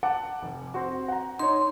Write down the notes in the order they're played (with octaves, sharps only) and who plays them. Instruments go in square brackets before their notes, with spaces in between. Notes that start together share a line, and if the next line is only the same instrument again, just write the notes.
[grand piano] F#5 A5 D6
F1
C4 F#4
F#5 A#5
[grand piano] D#4 C#5 [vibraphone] C6